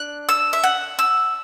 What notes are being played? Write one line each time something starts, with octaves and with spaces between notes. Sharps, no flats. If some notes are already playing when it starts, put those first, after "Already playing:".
Already playing: D4 F#6
E6
E5
F#5
E6